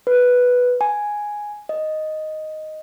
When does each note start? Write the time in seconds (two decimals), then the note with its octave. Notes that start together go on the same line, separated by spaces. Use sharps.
0.07 B4
0.81 G#5
1.69 D#5